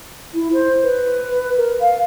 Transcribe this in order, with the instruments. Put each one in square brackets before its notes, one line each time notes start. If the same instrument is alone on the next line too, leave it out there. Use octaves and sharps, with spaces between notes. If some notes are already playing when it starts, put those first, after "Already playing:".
[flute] E4
C5
B4
A#4
F5